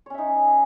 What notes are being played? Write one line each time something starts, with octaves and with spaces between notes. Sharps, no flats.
C#4 D#4 C#5 E5